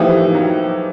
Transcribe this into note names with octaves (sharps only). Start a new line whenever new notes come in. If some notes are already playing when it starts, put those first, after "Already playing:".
Already playing: A2 E3 F3 A#3 D#4 G4
F#3